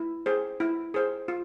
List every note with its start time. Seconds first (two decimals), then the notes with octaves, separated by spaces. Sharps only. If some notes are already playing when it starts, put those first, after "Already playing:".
Already playing: E4
0.26 G#4 C5
0.60 E4
0.94 G#4 C5
1.28 F4